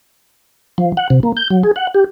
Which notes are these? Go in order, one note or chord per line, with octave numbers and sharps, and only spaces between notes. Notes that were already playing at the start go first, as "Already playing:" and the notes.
F3
F#5
C3
A#3
G6
F#3
G#4
F#5
G4